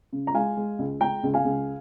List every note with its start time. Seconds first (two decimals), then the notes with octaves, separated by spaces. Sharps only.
0.13 C#3
0.27 A#5
0.34 G#3 F5 G#5
0.57 G#3
0.79 C#2
1.01 G#3 G5 A#5
1.23 C#2
1.34 F5 G#5
1.45 C#2